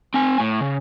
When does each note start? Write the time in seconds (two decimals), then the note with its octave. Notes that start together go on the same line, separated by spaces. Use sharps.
0.14 C4 G#5
0.40 A2
0.61 C#3